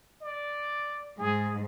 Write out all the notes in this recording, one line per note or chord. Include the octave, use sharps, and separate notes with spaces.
D5
G#2 G#4